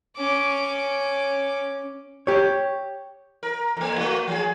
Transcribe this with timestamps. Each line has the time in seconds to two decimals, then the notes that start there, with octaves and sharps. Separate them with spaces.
0.17 C#4 D6
2.27 G4 C#5
3.43 A#4
3.77 F2 A#3
3.98 A3 F#4
4.28 F3 G#4